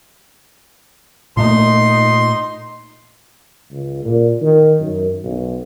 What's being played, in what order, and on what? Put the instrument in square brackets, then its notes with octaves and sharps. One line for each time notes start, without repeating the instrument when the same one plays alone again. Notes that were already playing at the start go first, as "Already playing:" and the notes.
[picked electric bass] A#2 A3 A#3 [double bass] D#4 [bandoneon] C6
[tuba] C#2
A#2
D#3
F#2
B1